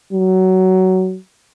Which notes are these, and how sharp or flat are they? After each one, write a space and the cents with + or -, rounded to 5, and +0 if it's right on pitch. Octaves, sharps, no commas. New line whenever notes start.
F#3 +15